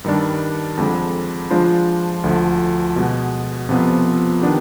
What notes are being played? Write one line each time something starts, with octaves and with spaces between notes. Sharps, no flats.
G2 D#3 G3 D4
F2 D3 G#3
F3 G#3 D4 F4 C5
D2 D3 F3
B2 G#3 B3
F2 C3 F3 B3 F4
D#3 B3 D4 G4